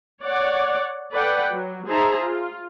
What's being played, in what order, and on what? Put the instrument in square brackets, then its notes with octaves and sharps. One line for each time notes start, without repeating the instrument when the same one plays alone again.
[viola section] C#5 D5 F#5
A4 B4 D5 F#5 G5
F#3
D#4 G#4 C5 E5 A5 A#5
F4